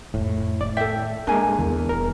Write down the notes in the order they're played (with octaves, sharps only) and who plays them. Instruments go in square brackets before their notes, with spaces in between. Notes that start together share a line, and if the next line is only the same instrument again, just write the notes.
[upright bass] F1 [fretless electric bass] A2
[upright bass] D#3 A#3 [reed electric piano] D5
[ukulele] A4 E5 [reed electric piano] G5
[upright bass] G3 [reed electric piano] G#3 A#3 A#4 [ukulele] D4 G#5
[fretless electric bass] E2
[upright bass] D#1 G3 [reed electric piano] A#4